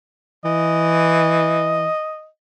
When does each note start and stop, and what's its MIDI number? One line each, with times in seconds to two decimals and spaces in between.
0.45 1.87 52
0.45 2.28 75